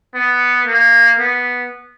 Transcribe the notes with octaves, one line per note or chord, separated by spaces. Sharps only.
B3
A#3
B3